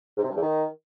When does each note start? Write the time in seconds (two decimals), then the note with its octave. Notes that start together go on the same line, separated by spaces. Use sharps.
0.17 G#2
0.23 C3
0.30 G2
0.36 E2
0.42 D#3